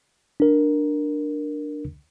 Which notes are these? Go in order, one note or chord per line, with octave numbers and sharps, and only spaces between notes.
D4 A#4